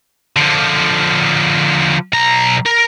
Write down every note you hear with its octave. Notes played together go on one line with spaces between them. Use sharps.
D3 F3
B1 A#5
A#4